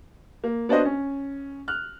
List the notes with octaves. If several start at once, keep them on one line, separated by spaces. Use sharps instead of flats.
A#3
B3 D4 F#4 C5 D#5
C#4
F6 F#6